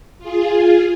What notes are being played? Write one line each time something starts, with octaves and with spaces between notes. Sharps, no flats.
F4 G#4